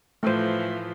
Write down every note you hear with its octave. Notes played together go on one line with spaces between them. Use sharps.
A2 E3 F3 A3 C5